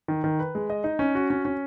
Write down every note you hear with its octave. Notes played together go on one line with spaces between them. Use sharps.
D#3
D#3
B4
G#3
D#5
D#4
C#4
F#4
C#4
C#4